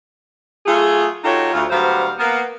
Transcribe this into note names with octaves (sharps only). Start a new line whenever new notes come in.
F#3 A3 F4 G#4
F#3 D#4 F4 G4 A4 C#5
D2 F4
D2 F#3 G3 B3 C5 F5
A#3 B3